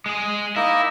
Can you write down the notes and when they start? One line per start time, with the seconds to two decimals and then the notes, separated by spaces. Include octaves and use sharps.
0.06 G#3 G#4
0.56 A#3 D#4 E4 D#5